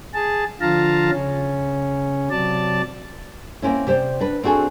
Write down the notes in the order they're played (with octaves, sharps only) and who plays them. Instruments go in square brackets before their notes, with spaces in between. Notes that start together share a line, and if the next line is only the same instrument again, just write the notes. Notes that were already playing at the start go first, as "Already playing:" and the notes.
[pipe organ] G#4 A5
D3 F3 F4 F5 A5 A#5
C#3 C#4
C3 F#3 D5 A5
[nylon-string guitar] A#3 C4 C#4 E4
C3 G4 C5 D5
D4 B4
C4 D4 F#4 G#4 A4